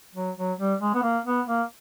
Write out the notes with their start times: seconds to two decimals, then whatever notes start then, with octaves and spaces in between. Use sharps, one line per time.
0.15 F#3
0.37 F#3
0.59 G3
0.81 G#3
0.95 B3
1.03 A#3
1.26 B3
1.47 A#3